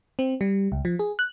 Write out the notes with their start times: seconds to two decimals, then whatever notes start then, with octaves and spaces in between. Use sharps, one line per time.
0.19 C4
0.41 G3
0.72 C#2
0.85 F3
0.99 G#4
1.19 F#6